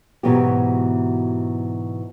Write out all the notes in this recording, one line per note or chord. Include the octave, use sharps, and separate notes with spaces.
G#2 B2 E3 F#3 B3 G4